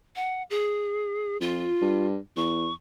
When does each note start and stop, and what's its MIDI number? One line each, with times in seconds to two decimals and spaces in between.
0.16 0.43 78
0.50 1.37 68
1.41 1.66 41
1.41 2.06 65
1.81 2.17 43
2.37 2.69 40
2.37 2.74 85